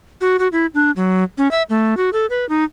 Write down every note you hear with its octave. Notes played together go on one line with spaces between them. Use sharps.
F#4
F#4
E4
D4
F#3
C#4
E5
A3
F#4
A4
B4
D#4